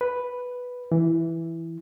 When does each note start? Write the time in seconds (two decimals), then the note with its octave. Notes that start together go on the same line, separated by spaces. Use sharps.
0.01 B4
0.92 E3